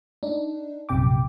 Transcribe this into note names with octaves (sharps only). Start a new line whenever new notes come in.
D4 D#4
A#1 F#2 C3 G5 D6